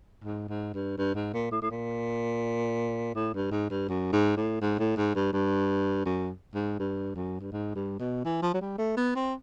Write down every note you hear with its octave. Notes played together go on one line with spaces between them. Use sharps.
G#2
G#2
G2
G2
G#2
A#2
A2
A2
A#2
A2
G2
G#2
G2
F#2
G#2
A2
G#2
A2
G#2
G2
G2
F#2
G#2
G2
F#2
G2
G#2
G2
B2
E3
F3
F#3
G3
A3
B3
C4